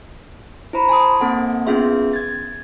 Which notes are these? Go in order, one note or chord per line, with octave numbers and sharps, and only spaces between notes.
E4 C5 A#5 B5
G#5 A5 C6 D#6
A#3 C4 A4 F#5 G#5
B3 C#4 F4 G#4 E5 C6
G#6 A6